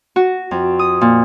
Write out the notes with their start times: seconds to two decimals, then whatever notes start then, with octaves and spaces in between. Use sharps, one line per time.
0.16 F#4
0.51 F2
0.79 D#6
1.01 A#2